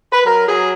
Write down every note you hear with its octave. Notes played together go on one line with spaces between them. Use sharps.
B4
F#3 A#4
F#3 G#4